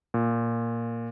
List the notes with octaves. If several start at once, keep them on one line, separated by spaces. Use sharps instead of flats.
A#2